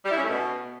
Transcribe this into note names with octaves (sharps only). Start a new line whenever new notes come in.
G3
E4
C#4
A3
B2